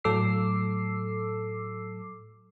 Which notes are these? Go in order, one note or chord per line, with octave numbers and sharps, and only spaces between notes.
A2 F#3 A4 D6 E6 C7